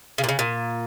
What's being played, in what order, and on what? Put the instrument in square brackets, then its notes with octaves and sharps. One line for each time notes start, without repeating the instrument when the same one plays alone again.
[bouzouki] C#3
A#2
C#3
A#2